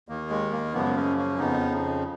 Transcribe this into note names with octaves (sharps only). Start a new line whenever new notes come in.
D#2 D#3 A#3
G#3
A#3
F#2 C#3 F3 G#3 B3
A#3 C#4
A#3 C#4
F2 C#3 F3 B3 D#4